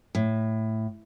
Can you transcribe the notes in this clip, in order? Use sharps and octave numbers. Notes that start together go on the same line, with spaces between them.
A2